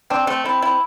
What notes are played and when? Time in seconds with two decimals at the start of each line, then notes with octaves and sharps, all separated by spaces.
0.10 C4 D4
0.27 A3 C4
0.45 C4 E4
0.62 E4